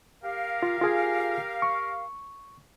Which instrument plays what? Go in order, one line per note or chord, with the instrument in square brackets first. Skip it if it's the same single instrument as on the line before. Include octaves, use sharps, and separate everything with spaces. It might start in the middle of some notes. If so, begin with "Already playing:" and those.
[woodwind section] G4 A#4 F5
[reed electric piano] F4
F4 G#4 G#5
C#6